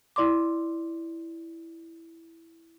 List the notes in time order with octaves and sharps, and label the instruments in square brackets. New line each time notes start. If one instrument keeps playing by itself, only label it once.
[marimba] E4 D5 C6 D6